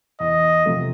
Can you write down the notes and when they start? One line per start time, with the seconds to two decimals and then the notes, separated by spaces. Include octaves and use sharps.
0.20 E2 D#5
0.66 C3 F3 A3